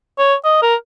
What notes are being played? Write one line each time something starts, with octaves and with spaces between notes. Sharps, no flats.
C#5
D#5
A#4